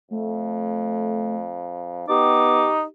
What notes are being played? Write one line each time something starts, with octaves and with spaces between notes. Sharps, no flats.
F2 A3
B3 D#4 G4 D6